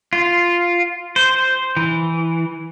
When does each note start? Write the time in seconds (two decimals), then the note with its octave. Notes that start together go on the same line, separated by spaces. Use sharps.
0.13 F4
1.16 C5
1.77 E3